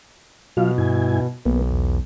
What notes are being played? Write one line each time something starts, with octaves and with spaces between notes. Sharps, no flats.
B2 F#3 F4 F5
G2 E4 G#5
B1 A#3 B3
E2